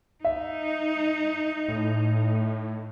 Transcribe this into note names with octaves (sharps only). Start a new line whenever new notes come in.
D#4 E5
A2